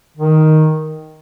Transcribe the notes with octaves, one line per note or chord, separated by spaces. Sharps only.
D#3